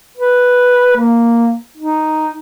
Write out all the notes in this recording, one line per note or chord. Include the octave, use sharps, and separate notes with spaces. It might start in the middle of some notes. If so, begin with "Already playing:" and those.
B4
A#3
D#4